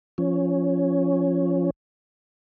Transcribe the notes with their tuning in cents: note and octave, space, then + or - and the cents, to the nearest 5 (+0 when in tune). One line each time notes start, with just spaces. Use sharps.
F3 +0 C#4 +0